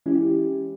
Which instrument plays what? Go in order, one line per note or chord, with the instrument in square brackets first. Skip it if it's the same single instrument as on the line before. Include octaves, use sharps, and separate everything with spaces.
[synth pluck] E3 G#3 C#4 E4 G4